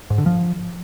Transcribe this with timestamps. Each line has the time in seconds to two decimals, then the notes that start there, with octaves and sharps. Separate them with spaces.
0.10 G#2
0.18 D3
0.26 F3